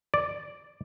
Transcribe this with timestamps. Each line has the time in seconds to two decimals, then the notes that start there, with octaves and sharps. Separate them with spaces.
0.14 D5